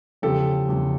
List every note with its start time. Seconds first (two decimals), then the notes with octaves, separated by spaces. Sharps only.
0.22 E2 C#3 F3 G4 A4
0.69 E2 C#3 F3